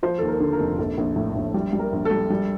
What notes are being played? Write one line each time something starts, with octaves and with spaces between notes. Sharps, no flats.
F3 C5
D#2 A4
A#4
D3
A#4
F1
A#1 A4
A#1
A2
A#1
G3
G3
A#4
A#1
A4
G3
G3